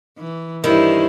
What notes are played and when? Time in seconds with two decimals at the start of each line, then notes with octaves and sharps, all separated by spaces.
0.18 E3
0.64 G2 D#3 G3 E4 C5